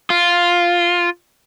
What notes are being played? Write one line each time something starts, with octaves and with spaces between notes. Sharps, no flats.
F4